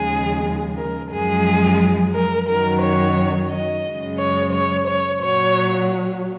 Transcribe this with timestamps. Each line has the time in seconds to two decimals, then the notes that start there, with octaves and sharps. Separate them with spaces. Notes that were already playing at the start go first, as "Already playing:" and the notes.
Already playing: D#2 C#3 F3 G#3 G#4
0.77 A#4
1.12 F#2 F3 G#3 G#4
2.14 A#4
2.48 F#2 D#3 F#3 A#4
2.82 C#5
3.51 D#5
3.84 F#2 C#3 G#3
4.18 C#5
4.52 C#5
4.87 C#5
5.21 A#2 F#3 C#5